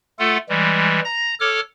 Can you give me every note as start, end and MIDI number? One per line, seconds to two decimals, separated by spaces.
0.19 0.38 57
0.19 0.38 65
0.19 0.38 69
0.19 0.38 78
0.49 1.00 52
0.49 1.00 55
0.49 1.00 56
1.05 1.34 82
1.05 1.34 94
1.40 1.60 69
1.40 1.60 73
1.40 1.60 86
1.40 1.60 89